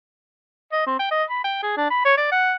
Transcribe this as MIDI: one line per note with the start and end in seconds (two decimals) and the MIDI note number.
0.72 0.86 75
0.86 0.96 60
0.99 1.07 79
1.11 1.24 75
1.29 1.41 83
1.44 1.58 79
1.63 1.74 68
1.77 1.86 62
1.90 2.04 83
2.05 2.16 73
2.17 2.30 74
2.32 2.55 78